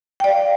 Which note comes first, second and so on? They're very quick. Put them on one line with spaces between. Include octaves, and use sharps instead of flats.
G5 D5 F5